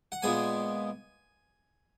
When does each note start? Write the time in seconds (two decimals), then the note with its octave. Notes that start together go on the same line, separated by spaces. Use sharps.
0.12 F#5
0.22 A#2 G#3 B3 G#5